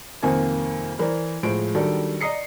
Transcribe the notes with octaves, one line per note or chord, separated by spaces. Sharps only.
C2 F2 D#3 A#3 C5 G#5
E3 E4 A#4 C5 D5
A2 F3 G#3 C5 D7
D#3 F#3 G3 D4 A4
D5 D#5 A#5 D#6 C7 C#7